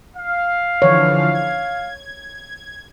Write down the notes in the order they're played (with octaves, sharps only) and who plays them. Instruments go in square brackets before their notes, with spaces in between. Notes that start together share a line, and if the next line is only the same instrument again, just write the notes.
[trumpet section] F5
[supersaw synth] D3 E3 F3 [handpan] C#5
[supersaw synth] G#6